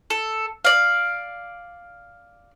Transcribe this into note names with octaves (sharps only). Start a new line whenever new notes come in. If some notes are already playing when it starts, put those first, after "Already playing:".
A4
D5 F5